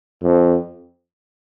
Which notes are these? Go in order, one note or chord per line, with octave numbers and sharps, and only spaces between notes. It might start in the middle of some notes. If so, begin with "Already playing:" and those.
F2